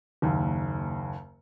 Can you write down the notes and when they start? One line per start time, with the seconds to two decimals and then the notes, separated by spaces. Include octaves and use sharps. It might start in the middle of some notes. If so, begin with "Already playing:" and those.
0.22 F#1 D#2